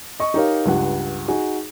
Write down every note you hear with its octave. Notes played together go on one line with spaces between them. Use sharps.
D#5 C#6
D#4 G4 A#4 C#5 F5
C#2 G2 F#5
D#4 F#4 G#4